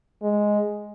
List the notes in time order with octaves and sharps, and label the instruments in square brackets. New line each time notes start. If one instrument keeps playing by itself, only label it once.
[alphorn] G#3